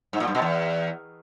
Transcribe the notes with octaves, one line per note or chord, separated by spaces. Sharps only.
G#2
A#2
G2
B2
E2